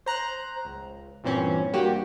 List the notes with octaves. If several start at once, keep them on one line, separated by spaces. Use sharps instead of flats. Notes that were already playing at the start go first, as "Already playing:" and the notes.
C5 A#5 F#6
C#2
G2 A#2 E3 C4 C#4
G2 A#3 F#4 G4 G5